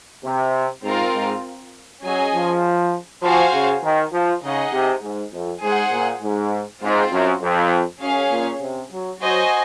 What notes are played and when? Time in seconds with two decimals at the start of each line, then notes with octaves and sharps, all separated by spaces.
0.24 C3
0.83 G#2 C4 F4 A#4
1.13 G#2
2.03 F#3 C#4 G#4 D#5 G#5
2.34 F3
3.22 F3 F#4 C5 F5 G#5
3.53 C#3
3.83 D#3
4.13 F3
4.43 C#3 D#4 G#4 D#5 F#5
4.73 C3
5.03 G#2
5.33 F2
5.63 G#2 G#4 C5 F#5
5.92 A#2
6.22 G#2
6.82 G#2 C4 F4 C5
7.12 F#2
7.41 F2
8.01 F#2 C#4 G#4 C#5 F5
8.31 A#2
8.60 C3
8.91 F#3
9.20 F#3 F#4 C5 D#5 G#5